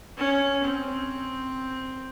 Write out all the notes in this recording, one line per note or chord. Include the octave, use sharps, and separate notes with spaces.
C#4
C4